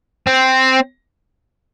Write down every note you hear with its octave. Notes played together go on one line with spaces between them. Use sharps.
C4